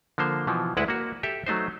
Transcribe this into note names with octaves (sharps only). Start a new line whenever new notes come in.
D3 F3 A#3 C5
B2 E3 F3
D2 G#3 E4 B4 F#5
A#3 F#4
G4 A4 E5
F#3 A3 D#4 C5